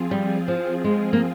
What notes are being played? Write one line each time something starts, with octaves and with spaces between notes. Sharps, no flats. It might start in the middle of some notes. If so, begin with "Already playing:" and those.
Already playing: F3 C4 F4 G#4
G3
F3
G#3
A#3